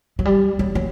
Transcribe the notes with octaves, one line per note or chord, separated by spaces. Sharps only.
F#3
G3
F#3
F#3